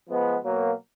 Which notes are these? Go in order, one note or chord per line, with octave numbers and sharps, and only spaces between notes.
F3 G#3 B3
B2 F#3 A#3